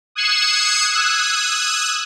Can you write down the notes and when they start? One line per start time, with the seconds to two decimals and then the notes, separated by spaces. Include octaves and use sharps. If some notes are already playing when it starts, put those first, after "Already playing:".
0.15 D#6 F#6 G#6 C7 C#7 E7
0.93 D#6 E6 F#6 G#6